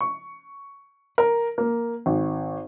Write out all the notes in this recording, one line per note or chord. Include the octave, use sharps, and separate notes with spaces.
C#6
A#4
A#3
G#1